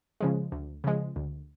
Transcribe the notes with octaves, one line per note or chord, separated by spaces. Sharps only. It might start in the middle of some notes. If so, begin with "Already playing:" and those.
C#3 F3 G#3
D2
C#3 F3 G#3
D2